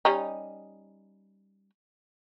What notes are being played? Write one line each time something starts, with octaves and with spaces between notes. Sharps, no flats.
G3 C#4 D#4